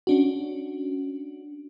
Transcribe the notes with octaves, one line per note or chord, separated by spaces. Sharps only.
C#4 D4 F#4